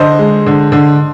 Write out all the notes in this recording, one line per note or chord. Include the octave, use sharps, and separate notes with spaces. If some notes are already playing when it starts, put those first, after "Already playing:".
Already playing: D3 C5 D#5
G#3
D3
D3